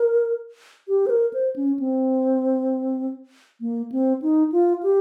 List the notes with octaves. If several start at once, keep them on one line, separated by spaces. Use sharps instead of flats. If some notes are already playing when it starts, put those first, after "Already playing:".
Already playing: A#4
G4
C5
A#4
C5
C#4
C4
A#3
C4
D#4
F4
G4